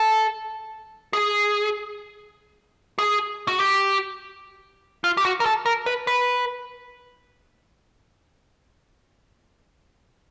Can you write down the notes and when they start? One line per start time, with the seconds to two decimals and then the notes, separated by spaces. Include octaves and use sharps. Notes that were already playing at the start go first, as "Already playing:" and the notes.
Already playing: A4
1.13 G#4
2.99 G#4
3.48 F#4
3.60 G4
5.04 F4
5.17 G4
5.25 F#4
5.40 A#4
5.46 A4
5.66 A#4
5.86 B4
6.07 B4